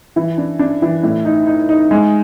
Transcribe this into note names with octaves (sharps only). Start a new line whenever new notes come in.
E3
D4
D4
E3
A2
D#4
D#4
D#4
G#3